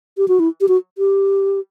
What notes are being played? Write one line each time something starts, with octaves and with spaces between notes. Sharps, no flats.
G4
F#4
E4
G4
F#4
G4